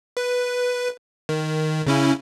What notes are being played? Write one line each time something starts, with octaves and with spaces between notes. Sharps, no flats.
B4
D#3
C#3 C#4 E4